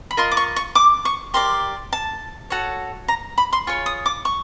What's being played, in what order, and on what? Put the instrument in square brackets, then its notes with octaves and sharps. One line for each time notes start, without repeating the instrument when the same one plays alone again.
[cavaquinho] B5
F4 A#4 D#5 C6
D6
C#6
C#6
D6
C#6
G4 A#4 D5 C6
A5
F#4 A4 C#5
A#5
B5
C6
F4 G#4 C#5 C#6
D#6
D6
C#6